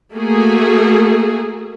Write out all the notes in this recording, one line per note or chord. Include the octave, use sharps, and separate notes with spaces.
A3 A#3 F#4 G#4